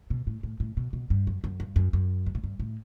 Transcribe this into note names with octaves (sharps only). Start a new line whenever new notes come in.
B2
A2
A2
A2
B2
B2
G2
F#2
F#2
G2
F#2
F#2
G2
A2
G2
A2